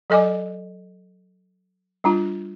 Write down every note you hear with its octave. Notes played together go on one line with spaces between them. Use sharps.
F#3 A4 D#5 G#5 D6
G3 D4 F4